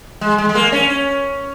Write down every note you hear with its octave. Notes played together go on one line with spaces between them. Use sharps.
G#3
G#3
G#3
A#3
C#4